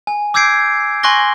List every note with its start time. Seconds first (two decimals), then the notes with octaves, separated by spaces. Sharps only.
0.07 G#5
0.34 D6 E6 G6 G#6 C7 D7
1.03 G#5 C6 C#6 F#6 A#6 G7